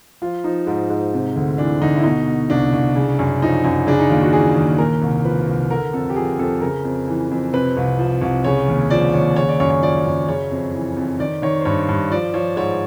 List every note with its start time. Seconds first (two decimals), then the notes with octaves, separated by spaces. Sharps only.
0.22 F3 F4
0.44 F3 D#4
0.67 G#2
0.90 G#2
1.14 C3
1.36 D2
1.58 E3 D4
1.81 D2 D#4
1.96 E4
2.04 B2 D#4
2.27 B2
2.50 C2 D4
2.73 C2
2.96 C#3
3.19 F#2
3.42 F3 D#4
3.64 F#2
3.87 C#3 D4
3.99 D#4
4.10 D#2 F4
4.22 F#4
4.33 E3 G#4
4.57 D#2
4.78 A#2 A#4
5.02 C2
5.24 F3 B4
5.48 C2
5.70 D3 A#4
5.93 F2 A4
6.10 G4
6.16 F3 G#4
6.39 F2 A4
6.61 C#3 A#4
6.85 F2
7.08 E3
7.31 F2
7.53 C3 B4
7.77 C2
7.99 F3
8.22 C2
8.44 C#3 C#5
8.68 D#2
8.90 F3 D5
9.14 D#2 C#5
9.36 C#3 C#5
9.48 D5
9.60 F#2 C#5
9.70 C#5
9.82 F3 D5
10.06 F#2
10.28 C#3 C#5
10.51 F2
10.73 E3
10.97 F2
11.19 D#3 D5
11.42 D#3 C#5
11.61 C5
11.65 G2 C#5
11.89 G2
12.11 F3 D5
12.34 F3 C#5
12.56 G#2 C#5